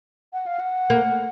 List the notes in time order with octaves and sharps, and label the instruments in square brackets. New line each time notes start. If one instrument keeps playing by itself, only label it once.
[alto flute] F#5
F5
F#5
[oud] A#3